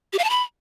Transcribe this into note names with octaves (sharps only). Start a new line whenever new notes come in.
G4
F5
A5
B5